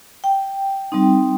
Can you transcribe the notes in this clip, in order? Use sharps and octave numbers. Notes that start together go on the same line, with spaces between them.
G5
G3 C4 D#4